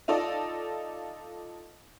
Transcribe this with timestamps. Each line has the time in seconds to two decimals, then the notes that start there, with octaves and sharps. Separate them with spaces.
0.08 D#4 F4 A4 D5 D#5